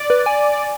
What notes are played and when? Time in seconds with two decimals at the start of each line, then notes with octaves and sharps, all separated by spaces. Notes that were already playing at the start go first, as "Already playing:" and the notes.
Already playing: D5
0.10 B4
0.26 G#5